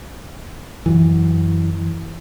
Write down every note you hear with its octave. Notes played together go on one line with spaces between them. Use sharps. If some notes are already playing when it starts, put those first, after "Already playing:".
F#2 E3